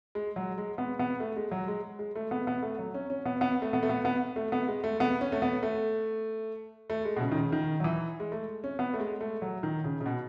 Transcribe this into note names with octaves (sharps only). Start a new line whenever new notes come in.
G#3
F#3
G#3
B3
B3
A3
G#3
F#3
G#3
G#3
A3
B3
B3
A3
F#3
C#4
C#4
B3
B3
A3
B3
A3
B3
B3
A3
B3
G#3
A3
B3
C#4
A3
B3
A3
A3
G#3
B2
C#3
D#3
C#3
D#3
F#3
E3
G#3
A3
C#4
B3
A3
G#3
A3
F#3
D#3
C#3
C#3
B2